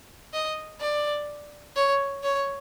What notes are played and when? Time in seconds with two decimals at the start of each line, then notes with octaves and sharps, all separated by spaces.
0.33 D#5
0.81 D5
1.76 C#5
2.23 C#5